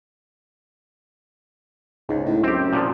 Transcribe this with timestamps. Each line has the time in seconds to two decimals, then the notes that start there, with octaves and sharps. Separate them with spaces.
2.09 C#2 G#2
2.26 A2
2.43 F#2 C4 G4
2.73 A#2 D3 F3